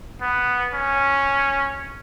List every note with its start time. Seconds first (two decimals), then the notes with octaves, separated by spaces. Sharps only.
0.22 B3
0.74 C#4